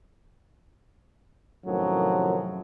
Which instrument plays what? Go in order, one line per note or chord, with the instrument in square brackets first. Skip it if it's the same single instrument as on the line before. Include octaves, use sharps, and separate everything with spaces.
[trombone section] F#2 A2 C3 D#3 F3 F#3